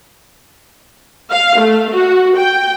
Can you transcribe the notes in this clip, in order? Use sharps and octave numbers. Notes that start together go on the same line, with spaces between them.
F5
A3
F#4
G5